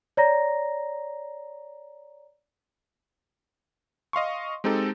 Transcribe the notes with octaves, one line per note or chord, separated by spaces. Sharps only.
C#5 D5 A#5 A#6
D#5 F5 C6 C#6
G#3 C4 D#4 G4 A4